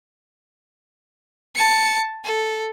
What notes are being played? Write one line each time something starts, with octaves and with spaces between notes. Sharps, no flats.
A5 C#7
A4